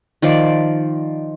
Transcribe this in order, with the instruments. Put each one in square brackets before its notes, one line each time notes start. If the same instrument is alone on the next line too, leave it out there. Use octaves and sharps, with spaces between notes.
[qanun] D#3 F3 D5